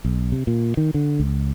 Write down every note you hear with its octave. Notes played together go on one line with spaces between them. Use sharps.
B1
C3
A#2
D#3
D3
C#2